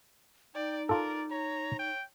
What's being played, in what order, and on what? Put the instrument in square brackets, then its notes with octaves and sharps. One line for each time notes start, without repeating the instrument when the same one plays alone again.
[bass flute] D#4 [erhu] D5 [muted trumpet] G5
[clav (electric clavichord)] F4 A4 [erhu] A#4 [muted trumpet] D5
[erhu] C#5 [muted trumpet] A#5
[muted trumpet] G5